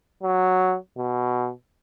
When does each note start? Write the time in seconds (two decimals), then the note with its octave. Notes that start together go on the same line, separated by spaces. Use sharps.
0.23 F#3
0.98 B2